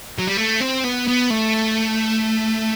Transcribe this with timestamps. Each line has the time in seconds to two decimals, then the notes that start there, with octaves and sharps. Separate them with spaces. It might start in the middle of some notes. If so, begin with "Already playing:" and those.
0.18 F#3
0.27 G3
0.37 A3
0.60 C4
0.84 B3
1.07 B3
1.30 A3